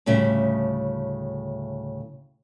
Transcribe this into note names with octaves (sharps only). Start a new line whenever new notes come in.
D2 A2 C#3 G3 E5